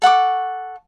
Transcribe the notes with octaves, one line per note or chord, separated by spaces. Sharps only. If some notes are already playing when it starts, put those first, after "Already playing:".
A4 F#5 C#6 D6